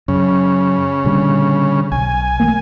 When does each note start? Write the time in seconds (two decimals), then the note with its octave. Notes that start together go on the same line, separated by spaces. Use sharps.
0.08 F#2 C#3
1.05 A#2 D3 G3
1.92 B1 G#5
2.40 E3 A3 A#3